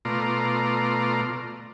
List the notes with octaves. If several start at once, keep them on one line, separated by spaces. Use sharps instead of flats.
B2 A3 F4 D5 A#5 C6